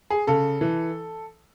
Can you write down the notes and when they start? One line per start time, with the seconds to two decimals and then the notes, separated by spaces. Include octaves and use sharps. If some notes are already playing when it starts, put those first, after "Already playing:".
0.10 G#4
0.27 C#3 A4
0.61 E3